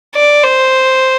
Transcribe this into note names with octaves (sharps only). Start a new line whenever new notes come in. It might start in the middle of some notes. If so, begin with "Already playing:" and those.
D5
C5